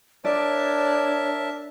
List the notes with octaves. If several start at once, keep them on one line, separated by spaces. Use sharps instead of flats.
D4 A#4 C#5 D5 E5 A5